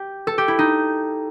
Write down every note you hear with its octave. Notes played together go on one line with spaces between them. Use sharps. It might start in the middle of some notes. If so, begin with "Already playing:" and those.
Already playing: G4
A4
G4
E4
D#4